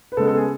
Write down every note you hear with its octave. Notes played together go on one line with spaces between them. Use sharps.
B4
C#3 G#3 B3 A4
A4
G#4